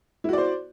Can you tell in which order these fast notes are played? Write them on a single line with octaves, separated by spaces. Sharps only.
E4 F#4 D5 C5